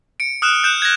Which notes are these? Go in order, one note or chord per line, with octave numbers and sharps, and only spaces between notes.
C#7 D7
D#6 F6 F#6 E7
F#6 G6 E7
G#6 A#6